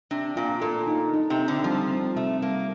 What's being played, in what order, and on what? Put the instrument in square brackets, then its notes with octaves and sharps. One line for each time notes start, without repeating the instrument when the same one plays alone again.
[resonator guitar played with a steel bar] C3 [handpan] D4
[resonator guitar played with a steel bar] A#2 [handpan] F4
[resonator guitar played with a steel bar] A#2 [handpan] A4
[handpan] D#4
D#4
[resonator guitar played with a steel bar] C3
[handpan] C4
[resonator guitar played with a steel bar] D3
[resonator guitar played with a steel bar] F3 [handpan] G3
[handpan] C4
[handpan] C3 [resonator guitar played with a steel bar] A3
[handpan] G3 [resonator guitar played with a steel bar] A#3